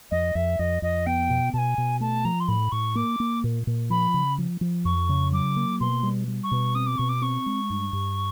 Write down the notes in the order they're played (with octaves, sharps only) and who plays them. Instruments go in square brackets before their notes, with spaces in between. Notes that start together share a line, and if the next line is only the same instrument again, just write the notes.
[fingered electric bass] F2 [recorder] D#5
[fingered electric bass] F2 [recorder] E5
[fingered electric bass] F2 [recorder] D#5
[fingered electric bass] F2 [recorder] D#5
[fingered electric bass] B3 [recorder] G5
[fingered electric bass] B2
[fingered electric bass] B2 [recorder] A5
[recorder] G#5
[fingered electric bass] B2
[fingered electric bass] A3 [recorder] A5
[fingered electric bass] F3 [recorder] A#5
[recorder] C6
[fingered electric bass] A2 [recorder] B5
[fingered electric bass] A2 [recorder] C#6
[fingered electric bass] A#3 [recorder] D6
[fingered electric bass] A#3
A#2
A#2
[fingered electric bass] F3 [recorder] B5
[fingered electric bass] C#3
F3
F3
[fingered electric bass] F2 [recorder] C#6
[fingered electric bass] C#3
[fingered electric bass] F#3 [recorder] D6
[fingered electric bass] A#3
[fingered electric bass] B2 [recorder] C6
[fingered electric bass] G3
G3
[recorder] C#6
[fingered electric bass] B2
[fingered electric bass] C4 [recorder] D#6
[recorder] D6
[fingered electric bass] B2 [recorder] C#6
[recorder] D6
[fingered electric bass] C4 [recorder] C#6
[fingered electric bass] G#3
G2
G2